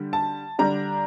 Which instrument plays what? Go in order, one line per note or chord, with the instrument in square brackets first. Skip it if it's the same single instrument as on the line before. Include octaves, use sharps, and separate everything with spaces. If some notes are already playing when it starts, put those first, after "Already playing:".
Already playing: [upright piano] D3 G3
A5
D3 G3 D4 A#5